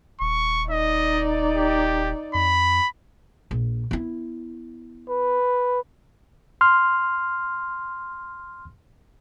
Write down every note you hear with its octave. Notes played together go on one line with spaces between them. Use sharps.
D#1 C#6
D#4 D5 D#5
G4
F2 B5
A#1
B3 E4
B4
C6 F6